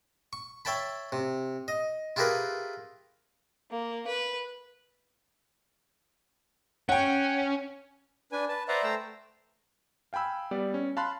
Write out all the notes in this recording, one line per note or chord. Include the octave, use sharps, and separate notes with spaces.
C#6
C#5 E5 G5 A5 B5
C3
D#5
E4 F4 G4 G#4 A#4 B4
A#3
B4
C#4 F#5 G5
D4 B4 G#5
B4 A5
B4 C5 D5 E5 F#5 A#5
A3 C5 G5 A#5 E6
F5 G5 G#5 B5 E6
G3 B3 D5
C#4
F5 A5 B5 C6 F#6